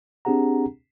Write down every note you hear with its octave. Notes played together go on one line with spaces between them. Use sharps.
C4 D4 G4 G#4 F#5 A#5